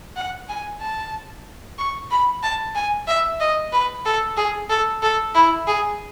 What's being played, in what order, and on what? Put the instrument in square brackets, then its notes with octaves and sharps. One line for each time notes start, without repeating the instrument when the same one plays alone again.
[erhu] F#5
G#5
A5
C#6
B5
A5
G#5
E5
D#5
B4
A4
G#4
A4
A4
E4
G#4